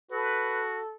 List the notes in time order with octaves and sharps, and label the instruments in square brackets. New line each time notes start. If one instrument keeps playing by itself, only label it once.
[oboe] F#4 [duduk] A4 [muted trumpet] B4